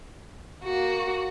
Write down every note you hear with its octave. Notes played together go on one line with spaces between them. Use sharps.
A#3 F#4